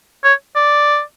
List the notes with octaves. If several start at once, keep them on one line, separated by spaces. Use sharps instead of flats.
C#5
D5